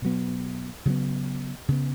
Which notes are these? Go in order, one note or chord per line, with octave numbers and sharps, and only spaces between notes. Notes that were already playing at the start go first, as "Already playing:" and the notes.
B2 F#3 B3
C#3 F#3 B3
C#3 B3